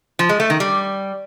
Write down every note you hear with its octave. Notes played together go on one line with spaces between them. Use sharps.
F3
G#3
A3
D#3
G3